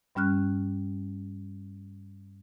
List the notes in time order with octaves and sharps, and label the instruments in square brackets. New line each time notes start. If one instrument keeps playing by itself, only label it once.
[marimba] G2 G3 C#4 F6 F#6